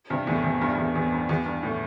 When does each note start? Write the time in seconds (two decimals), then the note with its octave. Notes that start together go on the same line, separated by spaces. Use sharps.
0.10 G2 C3
0.27 E2 A2
0.44 E2
0.61 G2
0.73 G2
0.78 E2
0.95 E2
1.12 G2
1.29 E2
1.46 G2
1.63 A2